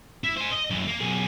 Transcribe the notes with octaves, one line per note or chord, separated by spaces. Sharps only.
E4
C5 G#5
D#5
F#2 E3
A#3
B1 G#4